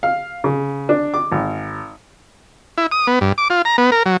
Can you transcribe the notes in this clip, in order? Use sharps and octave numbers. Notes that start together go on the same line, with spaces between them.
F5
C#3
D4
D6
G#1
E4
D#6
B3
G2
D6
F4
A#5
B3
A#4
F#3